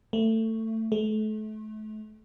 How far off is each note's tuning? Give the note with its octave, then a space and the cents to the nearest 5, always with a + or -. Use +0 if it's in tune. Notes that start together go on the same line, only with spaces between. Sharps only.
A3 +20
A3 -35